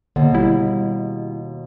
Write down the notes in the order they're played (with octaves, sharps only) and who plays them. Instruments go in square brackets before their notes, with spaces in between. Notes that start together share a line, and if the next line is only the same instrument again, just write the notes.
[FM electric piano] G#1 [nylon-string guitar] D#2 B2 [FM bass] D3
[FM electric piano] G3 [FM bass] E4